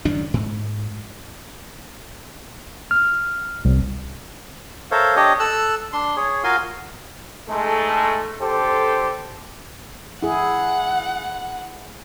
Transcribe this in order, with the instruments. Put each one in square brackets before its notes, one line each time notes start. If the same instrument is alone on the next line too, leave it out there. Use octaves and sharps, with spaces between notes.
[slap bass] C#2 F#2 D#3 D4
G#2
[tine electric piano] F6
C2
[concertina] A4 A#4 C5 C#5 E5 F5
D4 G4 C#5 D#5
A4 E6 F#6
D4 C6
G#4 C#5
F4 F#4 A#4 F5 G#5 C6
[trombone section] G#2 G#3 A3 A4
D3 G4 A4 C5
[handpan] E4 G#4 [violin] F#5